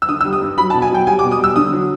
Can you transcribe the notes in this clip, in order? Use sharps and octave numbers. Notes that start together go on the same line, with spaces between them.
E6
D3 D#6
E6
G3
D#6
G2
F#3 B5
A5
B2
G#5
F#3 G5
G3 G#5
D6
B2
D#6
G3 E6
D3 D#6
F#3